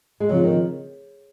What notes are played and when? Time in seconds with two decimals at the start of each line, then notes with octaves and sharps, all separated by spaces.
0.20 G#3
0.29 C#3 F3 F#3 C4 F4
0.44 D#3